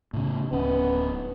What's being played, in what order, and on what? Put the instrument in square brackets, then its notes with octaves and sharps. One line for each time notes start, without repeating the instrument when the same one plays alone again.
[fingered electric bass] A2 C#3
[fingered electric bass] D1 C#4 [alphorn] B3